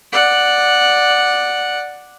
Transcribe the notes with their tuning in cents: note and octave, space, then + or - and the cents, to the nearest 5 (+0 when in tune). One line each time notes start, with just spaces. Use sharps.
D5 +5 F#5 -5